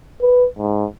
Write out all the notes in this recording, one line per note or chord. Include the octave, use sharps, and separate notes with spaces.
B4
G#2